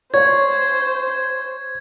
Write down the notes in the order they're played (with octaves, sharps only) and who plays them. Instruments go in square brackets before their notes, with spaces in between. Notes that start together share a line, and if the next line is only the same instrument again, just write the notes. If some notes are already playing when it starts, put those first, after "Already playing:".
[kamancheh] C5 [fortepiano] C#5 [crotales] G#6